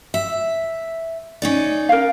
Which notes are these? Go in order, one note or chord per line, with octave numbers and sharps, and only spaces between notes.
E5
C#4 D#4 D5
A#4 F5